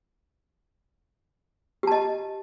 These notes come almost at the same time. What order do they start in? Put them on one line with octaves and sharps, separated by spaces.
G4 A5 D#5